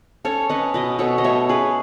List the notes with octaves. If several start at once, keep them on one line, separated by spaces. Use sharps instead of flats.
C#4 A4 C#5
C#4 B4 D#5
B2 B4 D#5
B2 A4 C#5
D#5
A3 C#5 E5
C#4 G#4 B4